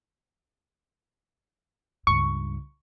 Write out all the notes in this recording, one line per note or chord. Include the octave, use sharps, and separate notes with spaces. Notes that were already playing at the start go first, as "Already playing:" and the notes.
C#2 G2 C#6